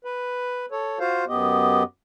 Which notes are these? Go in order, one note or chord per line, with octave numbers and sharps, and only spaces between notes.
B4
A4 C#5
F4 F#4 C5 F5
F#2 B3 G4 D#5